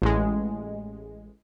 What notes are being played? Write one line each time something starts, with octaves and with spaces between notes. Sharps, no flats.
A1 G#3